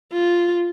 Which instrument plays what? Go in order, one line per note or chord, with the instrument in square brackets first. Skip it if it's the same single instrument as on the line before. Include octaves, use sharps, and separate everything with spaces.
[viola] F4